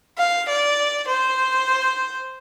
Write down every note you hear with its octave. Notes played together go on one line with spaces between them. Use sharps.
F5
D5
C5